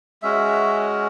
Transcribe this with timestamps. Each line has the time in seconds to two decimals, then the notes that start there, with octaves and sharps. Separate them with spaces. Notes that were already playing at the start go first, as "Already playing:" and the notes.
0.23 G#3 C#4 F#4 E5